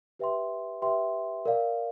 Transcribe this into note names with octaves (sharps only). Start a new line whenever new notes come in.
G4 B4 E5 G5 C6
G4 B4 E5 G5 C6
A#4 D5 F5